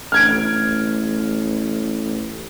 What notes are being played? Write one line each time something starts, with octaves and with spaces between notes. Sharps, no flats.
A1 F6 G#6 D7